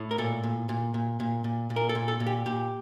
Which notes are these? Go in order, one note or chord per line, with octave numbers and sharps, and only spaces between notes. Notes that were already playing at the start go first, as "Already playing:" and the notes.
Already playing: A2
A#4
A#2 A4
A#2
A#2
A#2
A#2
A#2
A#2
A#4
A4
A#2
A4
A#2
G4
A#2 G4